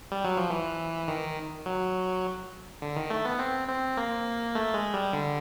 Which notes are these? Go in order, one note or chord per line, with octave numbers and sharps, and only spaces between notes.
G3
F#3
F3
E3
D#3
F#3
D3
D#3
A3
B3
C4
C4
A#3
A3
G#3
G3
D3